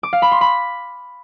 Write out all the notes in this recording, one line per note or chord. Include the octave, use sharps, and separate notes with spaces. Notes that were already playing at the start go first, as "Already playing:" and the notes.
D6
F5
B5
C6
B5